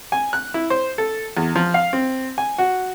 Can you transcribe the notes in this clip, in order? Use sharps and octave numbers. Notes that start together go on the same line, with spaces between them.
G#5
F#6
E4
C5
A4
E2
F3
F5
C4
G#5
F#4